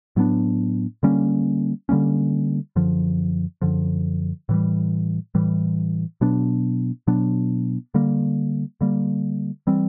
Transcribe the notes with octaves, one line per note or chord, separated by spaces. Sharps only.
A2 F#3 B3 D4
D3 G3 A#3 C#4
D3 G3 A#3 C#4
F#2 D3 F3
F#2 D3 F3
A2 E3 G3
A2 E3 G3
B2 F#3 B3 D4
B2 F#3 B3 D4
D3 G3 A#3
D3 G3 A#3
E3 G3 C4